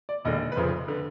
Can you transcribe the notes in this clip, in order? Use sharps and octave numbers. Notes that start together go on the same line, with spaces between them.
D5
E1 D#2 D3 D#5
B4
F1 F2 C#3 C5
D3 B4